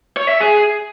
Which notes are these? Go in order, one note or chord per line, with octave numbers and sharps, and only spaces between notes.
C#5
E5
G#4